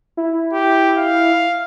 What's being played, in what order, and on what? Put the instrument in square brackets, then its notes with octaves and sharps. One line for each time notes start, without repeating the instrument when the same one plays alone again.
[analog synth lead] E4
[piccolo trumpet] G4
F5